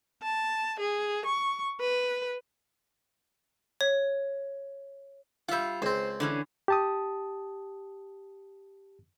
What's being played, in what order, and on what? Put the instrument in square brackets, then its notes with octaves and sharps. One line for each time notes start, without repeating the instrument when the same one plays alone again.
[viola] A5
G#4
C#6
B4
[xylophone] C#5
[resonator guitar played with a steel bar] G3 F4 [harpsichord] E5 F#5
[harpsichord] C#2 C4 [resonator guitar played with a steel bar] C5
[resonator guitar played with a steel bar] D3 E3 C#4
[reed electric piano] G4 A5 D#6